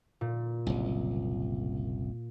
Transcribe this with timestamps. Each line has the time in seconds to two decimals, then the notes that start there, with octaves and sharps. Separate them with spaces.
0.21 A#2
0.67 F#1 C2